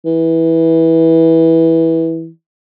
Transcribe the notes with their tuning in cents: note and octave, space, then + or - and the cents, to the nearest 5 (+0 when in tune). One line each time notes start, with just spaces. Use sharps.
E3 -15